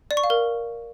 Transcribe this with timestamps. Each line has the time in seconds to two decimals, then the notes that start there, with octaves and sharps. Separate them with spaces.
0.11 D5
0.17 C#6
0.24 F5
0.30 A#4